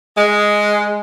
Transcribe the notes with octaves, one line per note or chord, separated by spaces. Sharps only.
G#3